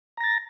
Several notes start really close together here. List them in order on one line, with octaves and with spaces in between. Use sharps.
A#5 A#6 A6